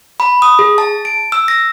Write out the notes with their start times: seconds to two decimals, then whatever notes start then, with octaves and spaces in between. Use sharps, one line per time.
0.20 B5
0.42 D#6
0.59 G#4
0.78 A5
1.05 D7
1.32 E6
1.48 A#6